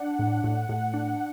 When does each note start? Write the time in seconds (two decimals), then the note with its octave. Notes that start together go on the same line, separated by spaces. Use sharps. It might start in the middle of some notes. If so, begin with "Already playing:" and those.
Already playing: D4 F#5
0.19 A2
0.44 A2
0.69 A2
0.94 D4